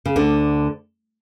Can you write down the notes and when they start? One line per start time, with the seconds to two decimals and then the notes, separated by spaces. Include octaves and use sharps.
0.06 C#3
0.16 D2 D3